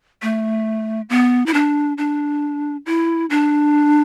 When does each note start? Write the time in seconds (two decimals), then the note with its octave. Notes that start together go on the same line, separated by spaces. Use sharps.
0.22 A3
1.10 B3
1.46 E4
1.54 D4
1.98 D4
2.86 E4
3.30 D4